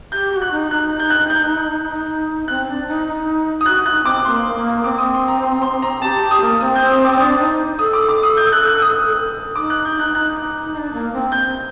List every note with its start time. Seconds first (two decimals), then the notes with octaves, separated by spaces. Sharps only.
0.12 G4 G6
0.32 G4
0.37 F#4
0.42 F#6
0.51 D#4
0.71 D#4 F#6
0.99 G6
1.10 F#6
1.30 G6
1.89 D#4
2.48 C4 F#6
2.68 D4
2.87 D#4
3.07 D#4
3.61 D#6
3.66 F#4 F#6
3.86 F#4 F#6
3.90 D#4
4.05 C4 D6
4.25 A#3 C6
4.54 A#3
4.84 C4 D6
4.98 D#6
5.14 C6
5.28 A#5
5.43 C6
5.62 C6
5.82 A#5
6.02 G4 A5
6.22 G4
6.31 D#6
6.41 A#3
6.60 C4 D#6
6.75 G6
6.90 D#6
7.05 D6
7.20 D4 D#6
7.39 D#4
7.78 A4 D#6
7.93 D6
8.09 D6
8.23 D#6
8.37 G6
8.52 F#6
8.67 F#6
8.82 D#6
9.56 D#4 D6
9.70 F#6
9.85 G6
10.00 F#6
10.14 D#4 F#6
10.73 D#4
10.78 D4
10.93 A#3
11.13 C4
11.32 G6